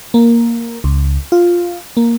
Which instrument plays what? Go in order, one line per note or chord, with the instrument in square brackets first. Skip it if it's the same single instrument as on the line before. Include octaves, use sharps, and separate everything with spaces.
[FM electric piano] A#3
C#2
F4
A#3